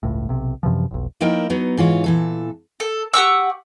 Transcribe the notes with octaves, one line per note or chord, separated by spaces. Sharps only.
G1 C#2 A2
B1 C3
F#2 C3 E3 F3
F1 B1
F3 A#3 D#4 E4 A#4 G5
F#3 B3 D#4
G#2 E3 F4 C#5
A#2 E3 A4
A4
G4 F#5 C#6 E6